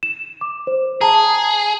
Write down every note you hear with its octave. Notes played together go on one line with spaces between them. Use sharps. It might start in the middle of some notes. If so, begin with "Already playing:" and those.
E7
D6
C5
G#4 A5 A#5